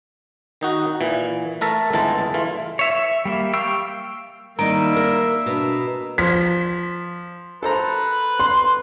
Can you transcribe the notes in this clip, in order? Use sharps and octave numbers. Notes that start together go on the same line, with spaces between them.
D#3 D#4 F#4
A#2 E3
A3 A#4 E5 A5
G1 C#2 E3 G#3 A5
E3 A3 F4
C#5 E5
E5
G3 A#3
F5 G5 C#6 E6
D#3 G3 A#3 D#4 E5 A#5 D7
A#4
B2 D4
F3 B6
A4 B4 C5 A#5
C6